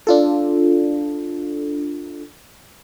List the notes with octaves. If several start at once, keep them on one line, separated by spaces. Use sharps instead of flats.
D4 F4 A4